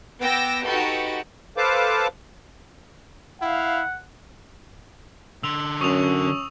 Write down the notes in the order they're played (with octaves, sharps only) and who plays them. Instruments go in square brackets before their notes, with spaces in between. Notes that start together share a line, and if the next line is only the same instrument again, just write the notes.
[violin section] B3 G5 D6 E6 A#6
D#4 F#4 G4 A4 B4
[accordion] A4 B4 C5 F5 A5 D6
[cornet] E4 [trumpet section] F5 [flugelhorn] F#5
[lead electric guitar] D3 C6 [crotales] E6 F7
[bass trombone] F#2 [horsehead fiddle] C#4 [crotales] C#6 D#6 F7